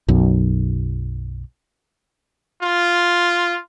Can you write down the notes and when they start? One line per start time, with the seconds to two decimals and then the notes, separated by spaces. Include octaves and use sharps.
0.08 B1 F#2
2.62 F4